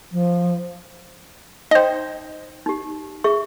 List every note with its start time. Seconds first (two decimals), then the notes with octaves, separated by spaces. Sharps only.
0.12 F3
1.71 D#4 C5 D#5 G5
2.66 D#4 G4
3.24 G#4 E5 C#6